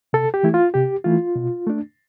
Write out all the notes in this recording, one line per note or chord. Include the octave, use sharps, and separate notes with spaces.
C3 A4
G4
E3 A3 E4
F4
C3 G4
E3 A3 E4 F4
B2
A3 D4